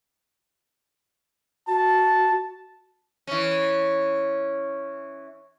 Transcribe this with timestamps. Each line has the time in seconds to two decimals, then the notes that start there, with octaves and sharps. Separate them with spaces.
1.68 F#4 A5
3.27 E3 C#4